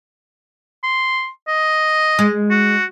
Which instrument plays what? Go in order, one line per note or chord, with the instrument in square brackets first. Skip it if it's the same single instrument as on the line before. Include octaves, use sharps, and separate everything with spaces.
[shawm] C6
D#5
[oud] G#3
[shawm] F#4